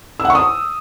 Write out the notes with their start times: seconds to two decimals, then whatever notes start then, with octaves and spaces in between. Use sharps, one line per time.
0.20 E6
0.25 F#5
0.30 C#6
0.35 D#6